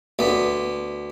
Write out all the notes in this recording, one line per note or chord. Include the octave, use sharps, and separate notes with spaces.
D2 B3